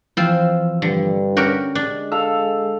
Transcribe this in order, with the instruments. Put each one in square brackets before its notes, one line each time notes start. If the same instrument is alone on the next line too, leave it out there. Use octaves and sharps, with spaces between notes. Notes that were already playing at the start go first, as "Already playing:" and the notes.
[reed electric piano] E3 F3 E6 [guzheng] C4 F4
[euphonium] G2 [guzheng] D3
[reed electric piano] C#4 [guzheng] F#4 G4 A#4
[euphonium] G#3 [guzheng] D4
[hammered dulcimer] A4 F5 [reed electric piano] E6